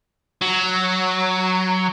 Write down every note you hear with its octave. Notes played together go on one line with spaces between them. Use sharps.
F#3